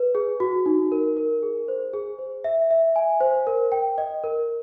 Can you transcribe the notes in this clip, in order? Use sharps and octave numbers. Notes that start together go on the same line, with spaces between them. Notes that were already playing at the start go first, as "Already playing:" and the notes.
Already playing: B4
G#4
F#4
D#4
A#4
A#4
G#4
C5
G#4
C5
E5
E5
G#5
C5
A#4
G5
D#5
A#4